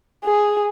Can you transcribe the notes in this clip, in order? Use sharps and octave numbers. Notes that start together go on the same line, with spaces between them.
G#4